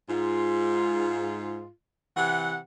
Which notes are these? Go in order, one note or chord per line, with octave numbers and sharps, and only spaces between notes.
G#2 F4
C3 E3 F#5